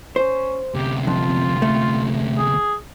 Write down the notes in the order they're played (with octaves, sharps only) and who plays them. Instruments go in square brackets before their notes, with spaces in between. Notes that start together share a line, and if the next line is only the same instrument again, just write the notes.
[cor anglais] C#4 [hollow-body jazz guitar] C5
[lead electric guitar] D2 C3 [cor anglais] G4
[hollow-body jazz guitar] F2 [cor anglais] F4
[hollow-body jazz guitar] A3
[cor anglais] G#4